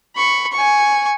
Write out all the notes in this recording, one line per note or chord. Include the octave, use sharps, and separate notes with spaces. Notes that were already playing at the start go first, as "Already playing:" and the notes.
B5 C#6
G#5 C#6